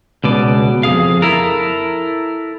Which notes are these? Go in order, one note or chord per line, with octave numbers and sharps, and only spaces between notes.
C#2 B2 D5
F2 A#2 G#4 F5
E4 A4 A#4